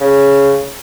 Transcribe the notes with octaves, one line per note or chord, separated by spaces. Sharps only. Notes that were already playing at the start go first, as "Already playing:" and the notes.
C#3